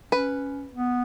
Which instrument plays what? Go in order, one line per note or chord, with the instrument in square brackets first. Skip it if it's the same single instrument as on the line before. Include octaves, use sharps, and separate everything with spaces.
[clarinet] C#4 [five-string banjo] B4
[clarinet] B3